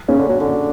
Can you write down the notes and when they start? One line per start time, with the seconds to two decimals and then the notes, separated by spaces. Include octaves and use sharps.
0.09 C#3 C#4
0.19 D3
0.29 F#3
0.40 D3